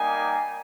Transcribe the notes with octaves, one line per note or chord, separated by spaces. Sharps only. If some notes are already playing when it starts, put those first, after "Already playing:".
Already playing: G3 A#3 D#4 G#5